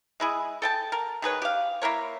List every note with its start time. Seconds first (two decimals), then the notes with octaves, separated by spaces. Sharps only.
0.20 G#3 E4 G#4
0.62 A4 G5 A5
0.92 A#4
1.22 D#3 G#4 B4 C#5
1.42 G4 F5
1.82 A#3 E4 A#4 C#5